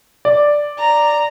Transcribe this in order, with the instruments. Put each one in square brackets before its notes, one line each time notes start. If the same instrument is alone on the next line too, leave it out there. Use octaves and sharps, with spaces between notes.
[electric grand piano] D5
[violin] A#5